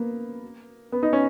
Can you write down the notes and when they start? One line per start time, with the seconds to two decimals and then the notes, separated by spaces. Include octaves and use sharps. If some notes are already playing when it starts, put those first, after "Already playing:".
Already playing: A#3 B3
0.92 B3
1.03 D#4
1.13 C#4